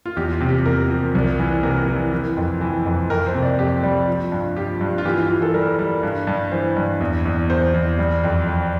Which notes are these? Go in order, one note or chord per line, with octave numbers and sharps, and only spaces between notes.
F4
E2 G4
F4
C3
G4
E2 A#4
F3
C2
E3
C3 A#4
E3
E3
F2
E3
F2
F2 A#4
C5
C3
D5
F2 G4
G3
F3
G2
F3 G4
G2
F4
E3 G4
F4
E3 F4
A4
G3 A#4
G3
G2
G2
E3 C5
G2
E2
E2
E2 C5
E2
G3
F2
G3